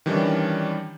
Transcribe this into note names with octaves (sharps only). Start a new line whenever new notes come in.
D#3 E3 G3 C#4 D4